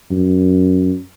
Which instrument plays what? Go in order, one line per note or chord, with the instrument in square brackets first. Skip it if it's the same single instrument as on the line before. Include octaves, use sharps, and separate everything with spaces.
[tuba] F#2